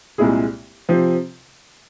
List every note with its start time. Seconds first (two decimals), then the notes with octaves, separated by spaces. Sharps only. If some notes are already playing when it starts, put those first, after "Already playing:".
0.18 C2 A#2 G#3 E4 G#4
0.89 C3 F3 C4